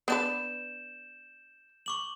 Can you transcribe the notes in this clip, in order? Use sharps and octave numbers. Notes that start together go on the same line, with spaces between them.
B3 D4 B4 G6 E7
C#6 D6 F#7